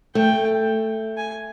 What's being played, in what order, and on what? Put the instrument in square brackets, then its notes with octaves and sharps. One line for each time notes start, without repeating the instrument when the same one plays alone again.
[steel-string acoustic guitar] A3 [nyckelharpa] G5
[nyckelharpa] G#5